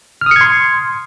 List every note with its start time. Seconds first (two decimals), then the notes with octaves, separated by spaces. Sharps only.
0.21 F6
0.26 D#6
0.31 C#7
0.36 G#6
0.41 C6